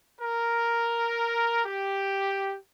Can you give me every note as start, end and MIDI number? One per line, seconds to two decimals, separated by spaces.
0.21 1.62 70
1.65 2.57 67